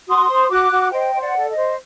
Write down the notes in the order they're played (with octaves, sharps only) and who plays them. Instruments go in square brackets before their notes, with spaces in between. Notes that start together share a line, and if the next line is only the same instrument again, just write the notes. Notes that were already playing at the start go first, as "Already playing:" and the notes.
[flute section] F#4 C6 D#6
C5
F#4 D6 F#6
F#4
C5 D#5 G5
C5
D5 F#5
A4
D#5
C5